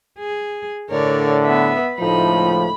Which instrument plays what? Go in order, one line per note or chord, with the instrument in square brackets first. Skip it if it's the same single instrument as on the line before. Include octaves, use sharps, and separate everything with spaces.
[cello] G#4
[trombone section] A2 D3 [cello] A#4 D5 [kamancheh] C#5
[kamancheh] B3 E5 [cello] B4
[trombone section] C#2 A2 [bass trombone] F3 [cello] D#4 [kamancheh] B5